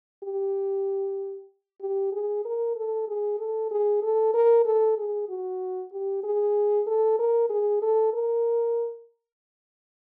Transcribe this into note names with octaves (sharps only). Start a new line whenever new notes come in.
G4
G4
G#4
A#4
A4
G#4
A4
G#4
A4
A#4
A4
G#4
F#4
G4
G#4
A4
A#4
G#4
A4
A#4